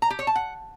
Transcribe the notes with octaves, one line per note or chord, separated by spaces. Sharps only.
A#5
G4
C#5
A5
F#5